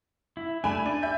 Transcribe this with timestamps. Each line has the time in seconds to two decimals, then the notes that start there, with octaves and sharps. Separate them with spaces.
0.37 E4
0.64 A3 D4 G#5 B5
0.86 D4 G#5
1.02 E5 G6